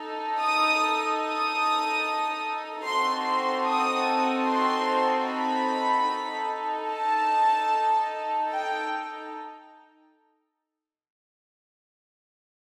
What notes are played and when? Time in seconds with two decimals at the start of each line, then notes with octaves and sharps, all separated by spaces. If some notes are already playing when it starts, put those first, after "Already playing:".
Already playing: D#4 A4
0.42 D#6
1.23 D#6
2.85 C4 D#4 F#4 A4 C6
3.25 C6
3.66 D#6
4.46 C6
5.28 B5
6.09 D#4 A4
6.90 A5
8.52 G5